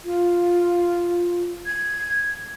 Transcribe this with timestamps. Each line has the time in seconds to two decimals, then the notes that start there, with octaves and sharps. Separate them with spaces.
0.05 F4
1.66 G#6